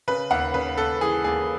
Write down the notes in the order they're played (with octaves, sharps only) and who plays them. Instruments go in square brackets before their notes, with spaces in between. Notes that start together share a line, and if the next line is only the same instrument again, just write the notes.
[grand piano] C#3 B4
D#2 F#5
C#3 B4
D#2 A4
E3 G#4
D#2 G#4